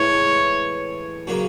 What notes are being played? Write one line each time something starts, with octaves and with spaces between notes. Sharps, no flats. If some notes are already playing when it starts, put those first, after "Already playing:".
Already playing: A2 E3 G#3 C#5
C#3 F#3 A#3 C#4 F#4